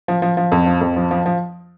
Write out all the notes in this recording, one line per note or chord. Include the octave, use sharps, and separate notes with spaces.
F3
F3
F3
F2
F3
F2
F3
F3
F3